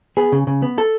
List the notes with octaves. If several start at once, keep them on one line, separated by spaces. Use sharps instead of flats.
B3 G#4
C#3
C#3
B3
A4